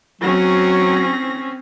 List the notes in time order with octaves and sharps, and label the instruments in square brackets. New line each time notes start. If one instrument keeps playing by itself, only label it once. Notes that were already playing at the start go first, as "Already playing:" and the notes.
[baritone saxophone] F#3 [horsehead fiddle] C4 C#4 [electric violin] A#6